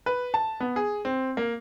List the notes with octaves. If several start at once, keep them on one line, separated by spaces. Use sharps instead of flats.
B4
A5
B3
G#4
C4
A#3